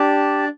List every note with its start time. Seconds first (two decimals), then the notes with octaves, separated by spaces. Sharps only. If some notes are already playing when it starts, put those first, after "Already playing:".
Already playing: D4 G4 D5 A5